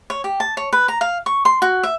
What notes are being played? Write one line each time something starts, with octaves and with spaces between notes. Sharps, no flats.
C#5
G4
A5
C#5
B4
A#5
F5
C#6
C6
F#4
E5